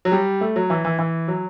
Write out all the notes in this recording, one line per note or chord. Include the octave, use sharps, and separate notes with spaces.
F#3
G3
A3
F#3
E3
E3
E3
F#3